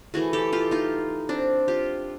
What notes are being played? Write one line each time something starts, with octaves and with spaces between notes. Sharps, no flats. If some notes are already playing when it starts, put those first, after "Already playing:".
E3 A3 F#4 G#4
G4 A4
F4 G4
D#4 F4
C4 D4
F4 G4